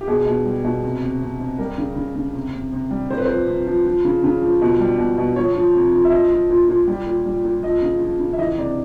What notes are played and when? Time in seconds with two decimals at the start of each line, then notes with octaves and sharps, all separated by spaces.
0.01 G4
0.07 B2 G#4
0.26 B2
0.45 G3
0.64 B2
0.83 C3
1.02 C3
1.22 C3
1.40 C3
1.58 G3 A#4
1.78 C#3
1.96 C#3
2.16 C#3
2.34 C3
2.54 C3
2.73 C3
2.91 G3
3.10 C3 C5
3.18 B4
3.25 F3 C5
3.47 C3
3.66 F3
3.86 F3
4.05 C#3
4.24 C#3
4.42 F3
4.61 B2
4.80 G3
4.98 B2
5.18 B2
5.36 F3 C#5
5.55 F3
5.75 C3
5.93 F3
6.05 E5
6.12 F3 D#5
6.32 F3
6.50 A#2
6.69 A#2
6.88 G3
7.06 A#2
7.26 G3
7.45 A#2
7.63 F3 D#5
7.82 C#3
8.02 F3
8.19 C#3
8.33 E5
8.39 E3 D#5
8.58 C3 D5